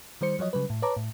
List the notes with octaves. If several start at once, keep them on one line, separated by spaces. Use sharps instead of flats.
D#3 G3 C5 C#7
F3 F#3 C#5 D#5
C#3 F#3 G3 B4
A2
B4 C#5 A5 A#5 D6
A2